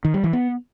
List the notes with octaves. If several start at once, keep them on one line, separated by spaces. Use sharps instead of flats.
D#3
G3
E3
B3